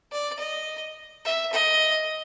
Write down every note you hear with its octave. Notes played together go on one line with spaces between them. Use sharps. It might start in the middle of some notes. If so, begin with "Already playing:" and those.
D5
D#5
E5
D#5